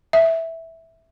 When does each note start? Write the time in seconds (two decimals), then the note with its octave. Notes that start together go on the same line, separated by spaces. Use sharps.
0.13 E5